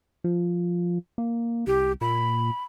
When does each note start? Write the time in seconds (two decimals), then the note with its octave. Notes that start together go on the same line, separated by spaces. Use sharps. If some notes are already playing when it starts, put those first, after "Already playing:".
0.24 F3
1.18 A#3
1.67 C2 G4
2.01 A#2 B5